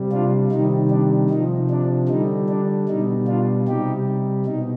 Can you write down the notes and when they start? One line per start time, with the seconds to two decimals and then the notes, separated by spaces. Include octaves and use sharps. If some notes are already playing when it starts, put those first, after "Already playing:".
Already playing: C3 G3
0.12 D4 F4
0.51 C3 D#3 G3 D#4
0.90 D4
1.30 C3 F3 D#4
1.70 D4
2.09 D3 G3 D#4
2.49 D4
2.88 B2 G3 D#4
3.27 D4 F4
3.67 C3 G3 D#4 G4
4.46 B2 D#4